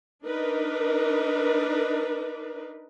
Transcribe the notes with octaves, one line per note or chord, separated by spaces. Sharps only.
D4 D#4 A#4 B4